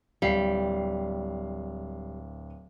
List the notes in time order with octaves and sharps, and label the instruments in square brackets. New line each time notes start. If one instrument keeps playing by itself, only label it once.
[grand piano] D1 F5 C7 [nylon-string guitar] G3